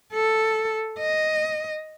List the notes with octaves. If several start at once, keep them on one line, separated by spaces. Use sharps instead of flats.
A4
D#5